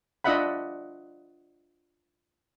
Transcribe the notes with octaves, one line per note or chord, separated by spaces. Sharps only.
D4 F4 D#5 E5 F#5 B5